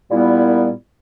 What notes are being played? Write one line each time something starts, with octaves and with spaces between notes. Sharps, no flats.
A#2 G3 B3 E4